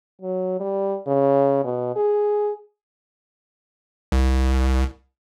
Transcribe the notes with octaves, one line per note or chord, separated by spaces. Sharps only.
F#3
G3
C#3
B2
G#4
C2